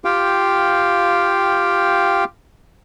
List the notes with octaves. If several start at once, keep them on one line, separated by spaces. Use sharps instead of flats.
F4 G4 F5 G5